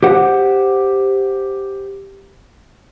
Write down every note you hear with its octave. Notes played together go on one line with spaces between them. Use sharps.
G4 C5 F#5